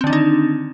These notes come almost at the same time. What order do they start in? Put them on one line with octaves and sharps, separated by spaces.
C4 D3 D4 D#3 D#4